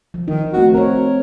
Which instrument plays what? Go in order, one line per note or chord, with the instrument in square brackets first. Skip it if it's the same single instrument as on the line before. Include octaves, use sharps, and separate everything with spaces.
[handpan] F3
[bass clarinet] D#3 [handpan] D#4
[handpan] A3 C4 D#4 [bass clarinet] F#4
[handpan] C4 D#4 C#5 [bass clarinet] A#4